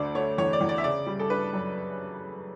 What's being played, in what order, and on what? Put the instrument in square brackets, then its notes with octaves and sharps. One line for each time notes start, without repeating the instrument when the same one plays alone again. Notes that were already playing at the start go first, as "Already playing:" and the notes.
Already playing: [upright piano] D2 D3 D5
A3 C#5
E2 C#5
D5
E2
D5
E5
C#3 D5
G3
A4
D4 B4
F#2